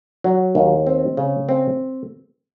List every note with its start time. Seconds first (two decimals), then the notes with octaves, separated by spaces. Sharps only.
0.24 F#3
0.55 D#2
0.87 C4
1.17 C#3
1.49 C4